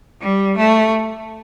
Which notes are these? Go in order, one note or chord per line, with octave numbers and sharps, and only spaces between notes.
G3
A3